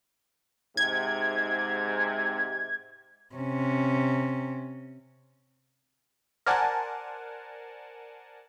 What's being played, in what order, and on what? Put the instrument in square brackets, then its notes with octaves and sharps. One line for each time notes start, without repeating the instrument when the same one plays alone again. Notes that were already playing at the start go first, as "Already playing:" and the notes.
[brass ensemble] G#2 C3 [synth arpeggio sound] G#6
[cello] C3 C#4
[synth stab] A#4 C5 D5 F#5 G#5 A5